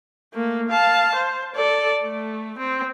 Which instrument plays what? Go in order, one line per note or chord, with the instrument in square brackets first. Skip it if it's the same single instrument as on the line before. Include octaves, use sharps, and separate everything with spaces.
[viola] A3 A#3
F5 A5
C5
A4 D5
A3
C4